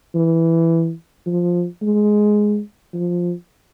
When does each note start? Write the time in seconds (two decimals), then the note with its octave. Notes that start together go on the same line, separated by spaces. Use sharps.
0.15 E3
1.26 F3
1.82 G#3
2.94 F3